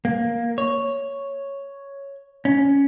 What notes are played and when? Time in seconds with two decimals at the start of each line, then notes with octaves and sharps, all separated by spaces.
0.05 A#3
0.58 C#5
2.45 C#4